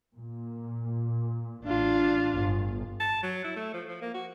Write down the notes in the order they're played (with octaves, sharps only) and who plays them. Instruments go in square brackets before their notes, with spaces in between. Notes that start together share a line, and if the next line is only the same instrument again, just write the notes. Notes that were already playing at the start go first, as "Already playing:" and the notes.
[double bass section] A#2
[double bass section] A1 [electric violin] D4 F4
[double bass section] G1
[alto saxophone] A5
F#3
E4
A3
F3
F3
A#3
F#4